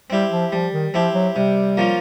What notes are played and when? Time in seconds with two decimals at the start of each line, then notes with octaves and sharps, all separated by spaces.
0.10 G3 C4 E4 G4
0.31 F3
0.52 F3 G3
0.73 D#3
0.93 F3 C4 E4 G4
1.14 F#3
1.36 C3 G3
1.77 F3 A#3 C#4 F4